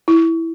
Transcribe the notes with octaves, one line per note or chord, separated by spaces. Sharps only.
E4